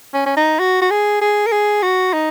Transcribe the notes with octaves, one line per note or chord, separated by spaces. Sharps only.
C#4
C#4
D#4
F#4
F#4
G#4
G#4
A#4
G#4
F#4
D#4